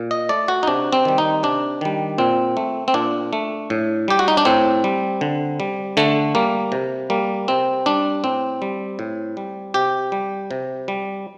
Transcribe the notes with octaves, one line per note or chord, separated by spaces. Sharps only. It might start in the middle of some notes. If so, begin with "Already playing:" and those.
Already playing: A#2
D#5
A3 D5
F#4
D#4
C3 D4
C4
D#3 G3
D#4
C3 D4
D#3 G3
A#2 C4
A3
C4
A#2 D4
A3
A2
G3 G4
F#4
D#4
D4
A2 C4
G3
D3
G3
D3 A3
G3 A#3
C3
G3 A#3
C3 C4
G3 D4
A2 C4
G3
A2
G3
C3 G4
G3
C3
G3